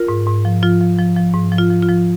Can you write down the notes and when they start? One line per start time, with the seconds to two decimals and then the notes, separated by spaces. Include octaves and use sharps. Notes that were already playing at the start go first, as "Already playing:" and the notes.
Already playing: F4 A#4
0.08 G#2
0.26 G#2
0.45 F3
0.63 F3 F4
0.81 F3
0.98 F3
1.16 F3
1.34 G#2
1.52 F3
1.58 F4
1.70 F3
1.82 F4
1.88 F3